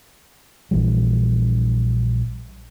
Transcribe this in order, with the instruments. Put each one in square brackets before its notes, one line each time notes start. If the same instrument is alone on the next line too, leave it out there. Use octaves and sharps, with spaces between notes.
[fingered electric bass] A#1 E3 G3